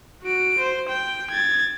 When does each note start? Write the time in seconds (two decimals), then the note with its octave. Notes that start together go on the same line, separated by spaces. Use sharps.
0.23 F#4 D7
0.59 C5
0.89 G5
1.30 G#6 A6